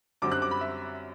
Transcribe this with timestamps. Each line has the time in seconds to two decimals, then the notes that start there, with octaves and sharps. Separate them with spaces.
0.22 F#2 D3 G3 C4 D6
0.32 F#6
0.42 D6
0.51 B5
0.61 E5